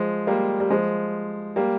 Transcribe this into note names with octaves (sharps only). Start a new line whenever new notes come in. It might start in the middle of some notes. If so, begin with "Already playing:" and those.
Already playing: F3 G#3
G3 A#3
G3
F3 G#3
G3 A#3